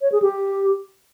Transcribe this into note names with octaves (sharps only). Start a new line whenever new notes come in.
C#5
G#4
G4